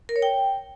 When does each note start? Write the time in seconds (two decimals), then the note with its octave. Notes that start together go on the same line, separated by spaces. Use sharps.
0.09 A#4
0.16 C#5
0.22 G5